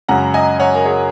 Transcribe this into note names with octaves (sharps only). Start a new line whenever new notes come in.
F#2 C#3 G#3 C#4 F#5 A#5
D#5 G#5
C#5 F#5
A#4
G#4 C#5